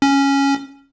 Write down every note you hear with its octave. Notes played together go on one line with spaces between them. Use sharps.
C#4